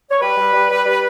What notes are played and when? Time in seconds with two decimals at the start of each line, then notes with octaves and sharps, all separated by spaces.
0.11 C#5
0.21 G3 B4
0.37 G3
0.53 G3
0.71 G3
0.86 G3